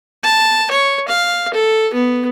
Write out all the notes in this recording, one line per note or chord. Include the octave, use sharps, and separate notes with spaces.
A5
C#5
F5
A4
B3